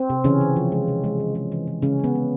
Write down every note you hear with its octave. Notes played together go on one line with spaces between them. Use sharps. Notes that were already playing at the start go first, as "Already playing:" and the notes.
Already playing: C4
C3
C#3 E3 C#4
E3
F3
G#3
C3
G#3
E3
G#3
E3
E3
C#3 G#3 C#4
G#3 B3
G#3